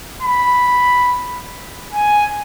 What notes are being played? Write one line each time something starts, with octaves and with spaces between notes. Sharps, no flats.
B5
G#5